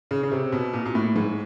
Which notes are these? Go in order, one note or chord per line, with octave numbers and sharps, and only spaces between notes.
C#3
C#3
C3
B2
A#2
A#2
A2
G#2